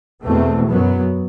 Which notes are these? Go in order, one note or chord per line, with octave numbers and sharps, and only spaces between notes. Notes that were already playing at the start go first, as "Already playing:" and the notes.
E2 B2 A3 C4
F#2 F#3 B3